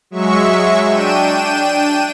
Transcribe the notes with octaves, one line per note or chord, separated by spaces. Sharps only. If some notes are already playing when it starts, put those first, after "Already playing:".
F#3 G#3 E5 C#6
D4 G5 D#7 E7